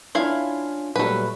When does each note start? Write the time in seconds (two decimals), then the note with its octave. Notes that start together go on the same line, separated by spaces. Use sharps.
0.15 C#4 D4 E4 F4 F5
0.96 A#2 F#3 G3 A3 B4